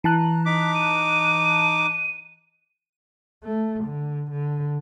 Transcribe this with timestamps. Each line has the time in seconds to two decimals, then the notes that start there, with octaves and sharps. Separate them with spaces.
0.04 E3 A5 A#5 F#6
0.46 D#4 D6 B6
0.74 D#7
3.43 A3
3.84 D3
4.31 D3